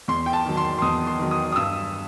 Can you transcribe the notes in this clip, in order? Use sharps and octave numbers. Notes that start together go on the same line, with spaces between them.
E2 C6
G5
A5
D#3 F#3
C6
C6
E2 D#6
C6
D#3 F#3
D#6
D#6
G2 E6